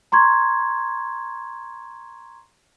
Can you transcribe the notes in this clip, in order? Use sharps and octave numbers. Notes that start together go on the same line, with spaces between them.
A#5 C6 C#6 G#6